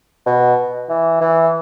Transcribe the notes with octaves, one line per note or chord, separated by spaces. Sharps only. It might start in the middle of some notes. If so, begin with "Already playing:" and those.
B2
E3
E3